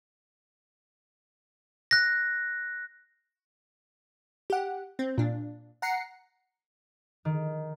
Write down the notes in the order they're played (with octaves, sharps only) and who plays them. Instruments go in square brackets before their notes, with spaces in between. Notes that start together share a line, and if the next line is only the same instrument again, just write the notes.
[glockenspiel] F#6 A#6
[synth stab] G4 F#5
C4
A#2 D4
F#5 A#5 C7 C#7
[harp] D#3